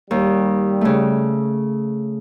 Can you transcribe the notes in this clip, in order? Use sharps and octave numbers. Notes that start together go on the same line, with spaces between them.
D#2 G3
C#3 A3